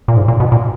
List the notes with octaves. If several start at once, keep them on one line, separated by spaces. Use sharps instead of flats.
A#2
G#2
A#2
B2
A#2